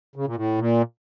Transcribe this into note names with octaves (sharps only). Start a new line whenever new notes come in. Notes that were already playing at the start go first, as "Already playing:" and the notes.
C#3
A#2
A2
A#2